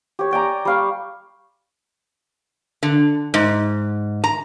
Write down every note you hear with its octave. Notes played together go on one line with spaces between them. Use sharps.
G4 C#5
D5 G5 G#5 A#5
G3 F5 C#6
D3
G#2
A#5